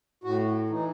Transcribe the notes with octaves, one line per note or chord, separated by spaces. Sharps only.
A2 F#4
E3 D#4